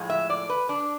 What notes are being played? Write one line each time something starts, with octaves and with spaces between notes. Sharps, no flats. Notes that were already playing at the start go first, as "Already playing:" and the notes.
Already playing: A2 F3 G#3
E5
D5
B4
D4